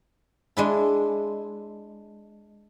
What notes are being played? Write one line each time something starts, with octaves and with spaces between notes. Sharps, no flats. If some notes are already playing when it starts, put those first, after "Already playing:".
G#3 D4 E4